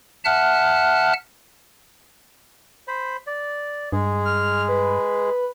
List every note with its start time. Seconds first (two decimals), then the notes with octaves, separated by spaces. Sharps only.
0.25 E5 F#5 A5 F6 F#6
2.88 C5 B5
3.27 D5
3.93 G2 G#3 G#4
4.25 F6
4.69 B4